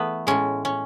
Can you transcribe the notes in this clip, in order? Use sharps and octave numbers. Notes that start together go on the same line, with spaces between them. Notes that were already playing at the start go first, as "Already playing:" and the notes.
Already playing: E3 A3 B3
A2 G#3 C#4
C#4